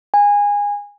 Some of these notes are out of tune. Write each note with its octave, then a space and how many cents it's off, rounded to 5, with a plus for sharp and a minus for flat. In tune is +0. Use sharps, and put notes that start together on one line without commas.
G#5 -20